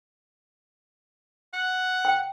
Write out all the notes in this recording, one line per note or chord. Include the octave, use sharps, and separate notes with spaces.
F#5
G5